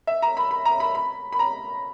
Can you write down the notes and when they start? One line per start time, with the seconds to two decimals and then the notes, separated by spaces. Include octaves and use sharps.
0.07 E5
0.22 A#5
0.37 B5
0.51 B5
0.65 A#5
0.80 B5
0.95 B5
1.33 B5
1.39 A#5